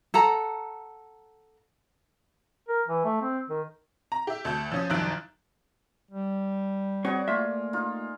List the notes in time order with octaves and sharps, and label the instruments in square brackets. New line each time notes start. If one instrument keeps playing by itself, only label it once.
[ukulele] A4 F#5 A#5
[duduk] A#4
E3
A3
C4
D#3
[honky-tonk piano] A#5
G4 E5
D2 A5 G6
F3 C#4 D#6
C2 F#2 D#3 F3 F#6 D7
[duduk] G3
[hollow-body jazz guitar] C4 C#5 [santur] F#4 G#4 [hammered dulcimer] D5
[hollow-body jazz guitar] A3 A#3 E5 [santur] F4
[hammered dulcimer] D#4 [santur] F4